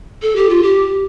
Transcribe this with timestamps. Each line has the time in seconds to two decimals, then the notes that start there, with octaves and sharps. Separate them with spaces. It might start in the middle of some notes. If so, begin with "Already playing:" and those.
0.22 A4
0.36 G4
0.49 F4
0.63 G4